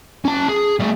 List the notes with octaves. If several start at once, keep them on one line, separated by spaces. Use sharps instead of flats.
C#4 A5
G#4
G3 A3